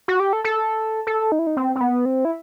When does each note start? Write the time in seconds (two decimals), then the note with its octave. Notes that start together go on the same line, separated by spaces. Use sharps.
0.08 F#4
0.20 G4
0.33 A4
0.44 A4
1.07 A4
1.32 D#4
1.39 E4
1.47 D#4
1.57 C4
1.75 C4
1.81 B3
2.05 C4
2.25 E4